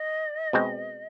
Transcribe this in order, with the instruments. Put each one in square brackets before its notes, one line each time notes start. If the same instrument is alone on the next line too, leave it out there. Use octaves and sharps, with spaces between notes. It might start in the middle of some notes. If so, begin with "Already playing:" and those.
Already playing: [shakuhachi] D#5
[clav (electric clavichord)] B2 G#3 C4